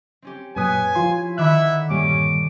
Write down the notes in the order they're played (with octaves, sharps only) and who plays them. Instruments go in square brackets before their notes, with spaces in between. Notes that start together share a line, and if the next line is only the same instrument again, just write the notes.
[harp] C4 C#4 G4
[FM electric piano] F#2 A#2 D#6 [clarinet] B4 [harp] C#5 [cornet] G#5
[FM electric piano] F3 F4 C6 [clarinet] E4
[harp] D3 D#3 F#5 [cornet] E5 [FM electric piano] B5 D6 F#6
[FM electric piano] G2 A#2 G3 [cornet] C#4 [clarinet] D6